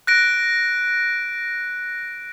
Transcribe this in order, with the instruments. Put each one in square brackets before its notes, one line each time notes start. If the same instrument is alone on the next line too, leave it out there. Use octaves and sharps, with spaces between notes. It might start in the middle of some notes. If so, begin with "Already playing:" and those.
[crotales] F#6 A#6 D7